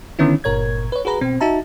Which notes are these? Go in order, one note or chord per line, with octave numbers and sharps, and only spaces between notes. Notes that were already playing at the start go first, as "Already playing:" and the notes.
D3 D#3 B3 C#4 E4
G1 A#2 A#4 C#5 G#6
B4 C#5
F#4 G#4 B4 A#5
B2 C4
D#4 F#4 E5 A5 A#5